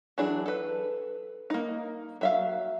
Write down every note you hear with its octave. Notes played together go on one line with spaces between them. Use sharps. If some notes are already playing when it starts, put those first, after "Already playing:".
E3 F#3 D4 G#4
A4 B4
A#3 D#4
F#3 E5 F5